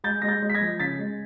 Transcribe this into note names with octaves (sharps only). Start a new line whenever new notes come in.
G#3 G6 A6
G#3 A#6
G6 A6
G#3
B6
G#6 A#6
F3
C#3 A6 B6
G#3